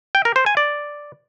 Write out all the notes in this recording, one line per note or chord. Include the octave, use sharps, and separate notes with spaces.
G5
A#4
C5
G#5
D5